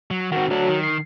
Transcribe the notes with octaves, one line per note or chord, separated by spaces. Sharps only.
F#3
D#3 C4 F#4
F#3 A3 D4
D#3
C7